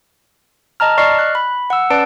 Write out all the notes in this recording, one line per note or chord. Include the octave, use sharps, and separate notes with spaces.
D#5 A5 A#5 F6
D5 D#5 C#6 F6 C7
F#6
B5
F#5 E6
C#4 B4 D5 A5 D7